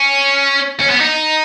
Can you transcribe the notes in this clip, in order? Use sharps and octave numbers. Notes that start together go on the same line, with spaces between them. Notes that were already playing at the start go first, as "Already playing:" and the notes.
Already playing: C#4
C#4
B3
D#4